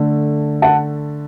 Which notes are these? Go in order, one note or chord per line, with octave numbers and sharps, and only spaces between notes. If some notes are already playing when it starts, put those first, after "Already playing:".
Already playing: D3 A3
F#5 A5